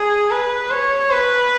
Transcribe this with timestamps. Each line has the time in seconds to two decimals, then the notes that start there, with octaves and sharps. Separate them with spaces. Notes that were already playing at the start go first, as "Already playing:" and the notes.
Already playing: G#4
0.30 B4
0.70 C#5
1.11 B4